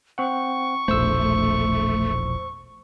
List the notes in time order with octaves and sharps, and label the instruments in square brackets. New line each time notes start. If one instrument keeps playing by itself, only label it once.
[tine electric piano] C4 F#5 [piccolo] C#6
[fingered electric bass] E1 A#1 [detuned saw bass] A3 [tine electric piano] C5 E6